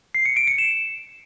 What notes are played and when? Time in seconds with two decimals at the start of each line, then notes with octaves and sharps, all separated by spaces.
0.15 C7
0.25 C#7
0.36 D7
0.47 C#7
0.58 E7